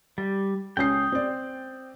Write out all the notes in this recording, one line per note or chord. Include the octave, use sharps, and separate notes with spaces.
G3
C#2 C#4 G5 D#6 C7
C4 D5